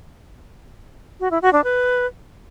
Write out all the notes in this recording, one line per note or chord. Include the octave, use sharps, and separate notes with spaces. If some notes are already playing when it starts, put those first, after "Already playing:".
F#4
E4
F#4
D4
B4